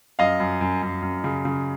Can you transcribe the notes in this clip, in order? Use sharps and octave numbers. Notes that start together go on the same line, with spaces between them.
F#2 D#5 F5
F#2
F#2
F#2
F#2
C#3
C#3